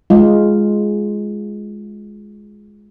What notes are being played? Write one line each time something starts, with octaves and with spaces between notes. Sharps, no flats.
G#3 F4